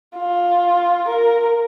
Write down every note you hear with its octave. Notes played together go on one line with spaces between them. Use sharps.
F4
A#4